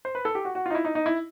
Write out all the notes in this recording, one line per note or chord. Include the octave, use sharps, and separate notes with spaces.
C5
B4
A4
G4
F#4
F#4
D#4 F4
E4
D#4
D#4
E4